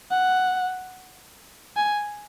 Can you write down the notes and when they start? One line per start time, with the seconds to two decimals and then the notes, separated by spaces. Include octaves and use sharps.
0.11 F#5
1.76 G#5